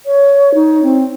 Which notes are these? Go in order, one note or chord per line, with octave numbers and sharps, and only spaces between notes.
C#5
D#4
C4